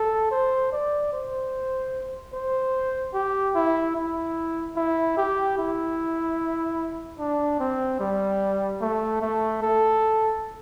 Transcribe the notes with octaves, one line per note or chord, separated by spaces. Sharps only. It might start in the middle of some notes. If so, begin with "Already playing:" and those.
Already playing: A4
C5
D5
C5
C5
G4
E4
E4
E4
G4
E4
D4
C4
G3
A3
A3
A4